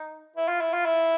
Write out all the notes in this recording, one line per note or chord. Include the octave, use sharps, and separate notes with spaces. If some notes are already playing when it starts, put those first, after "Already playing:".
Already playing: D#4
E4
F4
E4
F4
E4